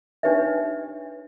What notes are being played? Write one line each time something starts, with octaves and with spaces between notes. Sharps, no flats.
D4 D#4 G4 B4 C#5 E5